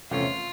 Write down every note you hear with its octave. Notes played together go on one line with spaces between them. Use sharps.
E2 C3 F3 A3 C#4 F4